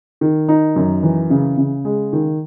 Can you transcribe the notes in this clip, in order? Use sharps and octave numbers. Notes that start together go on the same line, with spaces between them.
D#3
D#4
F#2
E3
C#3
C#3
G#3
D#3